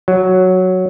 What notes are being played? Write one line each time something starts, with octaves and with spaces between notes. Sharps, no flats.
F#3